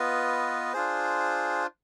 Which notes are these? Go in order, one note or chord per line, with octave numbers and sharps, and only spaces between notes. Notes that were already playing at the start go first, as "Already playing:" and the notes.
Already playing: B3 F4 B4 D#5
D4 F4 G#4 C5